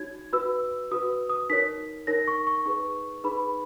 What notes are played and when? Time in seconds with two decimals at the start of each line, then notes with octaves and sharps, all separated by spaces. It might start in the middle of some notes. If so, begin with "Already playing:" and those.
Already playing: D#4 F#4 C#5 G#6
0.33 F#4 B4 E6
0.91 F#4 B4 D#6
1.29 D#6
1.50 D#4 A#4 C#5 B6
2.07 D#4 A#4 C#5 A#6
2.28 C#6
2.47 C#6
2.65 D#4 G#4 B4 C#6
3.24 D#4 G#4 B4 B5